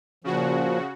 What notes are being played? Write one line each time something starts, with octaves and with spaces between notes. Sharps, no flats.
A#2 C#3 F3 F#4